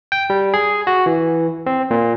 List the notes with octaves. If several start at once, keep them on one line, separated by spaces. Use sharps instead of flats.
G5
G3
G#4
F#4
E3
C4
A#2